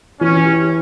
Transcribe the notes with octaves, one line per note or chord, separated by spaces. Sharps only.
E3 C#4
G4